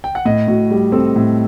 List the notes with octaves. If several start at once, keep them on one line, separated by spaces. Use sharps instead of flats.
G5
F#5
A2 D#5
A2 F#4
G3 G4
C4 A4
A2